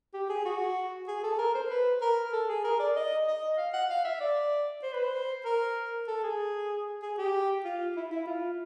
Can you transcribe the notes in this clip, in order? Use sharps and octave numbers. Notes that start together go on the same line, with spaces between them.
G4
G#4
F#4
G#4
A4
A#4
C5
B4
A#4
A4
G#4
A#4
D5
D#5
D#5
F5
F#5
F5
E5
D5
C5
B4
C5
A#4
A4
G#4
G#4
G4
F4
E4
E4
F4